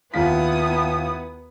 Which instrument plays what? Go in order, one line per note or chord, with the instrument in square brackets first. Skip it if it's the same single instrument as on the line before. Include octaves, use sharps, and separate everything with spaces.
[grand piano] D#2 F4 B6 [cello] B3 [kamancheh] E4 D#6